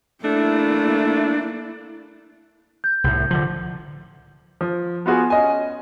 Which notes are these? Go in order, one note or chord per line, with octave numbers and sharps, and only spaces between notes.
A3 A#3 D4 E4
G6
C2 A2
D3 F3
F3
B3 F4 F#4 G#4
C#4 D#5 G#5